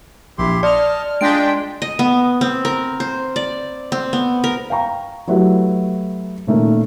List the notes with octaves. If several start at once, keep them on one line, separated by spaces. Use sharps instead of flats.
A#1 E4 G4 C6
D5 D#5 A5 F6
G#3 D4 F4 G5 B6 D7
D#5
B3
C4
A#4
C5
D5
C4
B3
A#4
F5 G5 A#5 C#6
F#3 A3 E4 F#4 G4 B4
A#2 D#3 A3 A#3 C#4